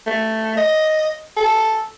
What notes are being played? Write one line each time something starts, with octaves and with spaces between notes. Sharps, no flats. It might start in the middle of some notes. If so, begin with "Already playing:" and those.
A3
D#5
A4